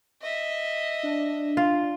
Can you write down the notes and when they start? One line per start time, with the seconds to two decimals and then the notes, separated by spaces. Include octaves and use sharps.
0.22 D#5 E5
1.03 D4
1.57 F4